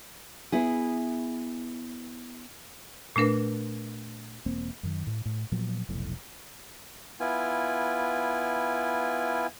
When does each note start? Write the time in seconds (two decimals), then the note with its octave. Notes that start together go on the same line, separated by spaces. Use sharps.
0.52 B3 E4 G#4
3.16 A#2 A3 D4 A#4 B4
4.46 E1 A#3 C4
4.83 F#2 D#3
5.07 A2
5.25 A2
5.52 A#2 F3 F#3 B3
5.89 F1 B1 A2
7.20 B3 E4 F4 G#5